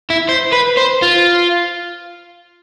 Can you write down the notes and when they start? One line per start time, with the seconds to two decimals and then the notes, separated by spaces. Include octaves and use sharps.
0.10 E4
0.29 C5
0.53 B4
0.77 C5
1.02 F4